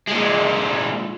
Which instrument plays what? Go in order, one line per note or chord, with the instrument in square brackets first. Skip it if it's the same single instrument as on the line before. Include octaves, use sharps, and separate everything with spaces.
[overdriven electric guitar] A#2 G#3